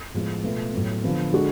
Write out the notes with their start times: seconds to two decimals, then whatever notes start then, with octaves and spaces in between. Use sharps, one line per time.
0.14 A2 F3 G#3 B3
0.44 B2 A3 F4 B4
0.73 A2 F#3 B3
1.03 D3 F3 B3
1.32 D3 G#3 D4 F#4 A4